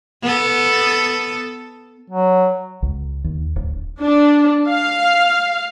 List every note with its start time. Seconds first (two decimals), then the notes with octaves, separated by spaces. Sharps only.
0.22 B3 A4
2.10 F#3
2.82 C#2
3.24 D#2
3.56 D1
4.02 D4
4.69 F5